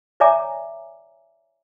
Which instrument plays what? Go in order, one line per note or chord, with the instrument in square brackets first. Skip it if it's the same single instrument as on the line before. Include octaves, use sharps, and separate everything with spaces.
[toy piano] C#5 D5 E5 G#5 A#5 D6